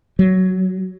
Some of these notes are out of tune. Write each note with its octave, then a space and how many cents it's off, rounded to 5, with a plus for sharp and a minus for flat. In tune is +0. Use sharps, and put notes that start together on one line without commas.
F#3 +10